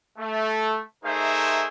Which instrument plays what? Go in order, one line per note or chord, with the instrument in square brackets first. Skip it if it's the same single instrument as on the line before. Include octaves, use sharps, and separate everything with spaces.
[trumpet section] A3
A3 D#4 G#4 A#4 C5 E5